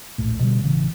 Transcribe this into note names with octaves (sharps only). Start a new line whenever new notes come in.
D#1 A#1 A2
B2 D3 D#3 G3
A1 C#3 E3